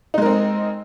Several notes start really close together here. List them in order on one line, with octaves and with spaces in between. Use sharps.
D#4 G#3 A#4 C4